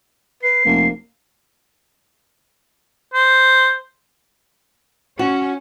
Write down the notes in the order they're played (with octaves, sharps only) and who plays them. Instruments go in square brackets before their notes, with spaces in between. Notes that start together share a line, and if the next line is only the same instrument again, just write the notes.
[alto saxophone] B4 [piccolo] C7
[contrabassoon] F1 [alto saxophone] A#3
[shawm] C5
[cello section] C#4 C#5 [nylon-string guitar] F#4